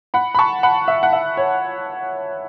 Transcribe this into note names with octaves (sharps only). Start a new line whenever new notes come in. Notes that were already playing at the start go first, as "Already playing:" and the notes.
F#5 B5
B5
A5 C#6
F#5 B5
E5
F#5
E5
C#5